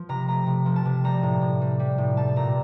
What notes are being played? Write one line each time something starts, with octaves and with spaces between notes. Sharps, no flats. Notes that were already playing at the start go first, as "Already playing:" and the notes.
Already playing: F3
C3 A#5
A3 A#5
C3
F3
A5
C3
G3 A#5
A2
A2
G3
G3
A2
G3 A5
A#2 A#5